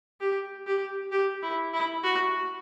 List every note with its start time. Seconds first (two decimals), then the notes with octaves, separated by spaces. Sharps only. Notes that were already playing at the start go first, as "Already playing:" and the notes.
0.20 G4
0.66 G4
1.12 G4
1.43 E4
1.74 E4
2.03 F#4